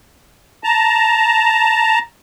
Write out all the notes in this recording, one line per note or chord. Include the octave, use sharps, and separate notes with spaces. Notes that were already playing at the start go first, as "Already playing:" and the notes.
A5 A#5